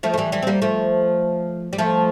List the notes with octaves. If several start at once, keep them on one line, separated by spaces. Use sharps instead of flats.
F3 A3
A3
E3 G3
E3 G3
C4
G3 A#3
F3 A3
G3
F3 A3